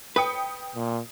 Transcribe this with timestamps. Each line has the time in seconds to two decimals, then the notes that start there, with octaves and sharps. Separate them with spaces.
0.16 B4 G5 D#6 C#7
0.75 A#2